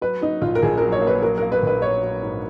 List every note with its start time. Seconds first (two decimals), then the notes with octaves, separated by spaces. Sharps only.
0.02 F#3 B4
0.21 F#3 D#4
0.41 A#1 F4
0.55 A#4
0.62 A#1 G#4
0.78 F#3 A#4
0.92 C#5
1.01 A#3
1.07 B4
1.22 F#3 A#4
1.38 A#3 A#4
1.52 B4
1.62 A#1 B4
1.82 A#3 C#5
2.03 F#3
2.22 G#2